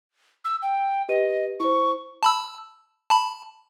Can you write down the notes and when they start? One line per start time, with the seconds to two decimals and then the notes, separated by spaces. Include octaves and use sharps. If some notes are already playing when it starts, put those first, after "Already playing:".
0.45 E6
0.62 G5
1.09 G4 B4 D#5 D#7
1.60 E4 C5 C#6
2.23 A5 B5 E6
3.10 A5 B5